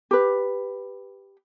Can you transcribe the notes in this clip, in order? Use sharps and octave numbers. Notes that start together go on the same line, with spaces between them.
G4 B4